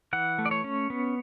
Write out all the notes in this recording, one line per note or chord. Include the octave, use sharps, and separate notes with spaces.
E3 F#5
A3
D5
C#5
C#4
B3